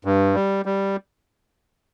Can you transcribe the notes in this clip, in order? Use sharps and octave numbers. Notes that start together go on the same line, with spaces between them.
G2
G3
G3